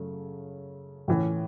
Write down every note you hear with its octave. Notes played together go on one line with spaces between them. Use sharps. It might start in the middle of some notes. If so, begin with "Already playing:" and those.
Already playing: F#2 C#3 A3
A2 E3 C#4